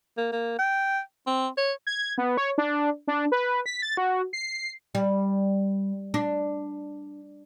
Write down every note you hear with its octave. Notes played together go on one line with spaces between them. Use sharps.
A#3
A#3
G5
C4
C#5
G#6
B3
C#5
D4
D4
B4
B6
A6
F#4
C7
G3
D4